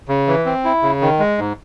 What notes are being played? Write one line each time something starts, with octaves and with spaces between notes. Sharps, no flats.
C#3
E3
C4
E4
C#3
D#3
G#3
G#2